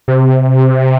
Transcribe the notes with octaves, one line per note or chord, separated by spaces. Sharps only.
C3